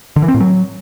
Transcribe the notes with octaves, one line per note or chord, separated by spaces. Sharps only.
D3
E3
C4
A2
F#3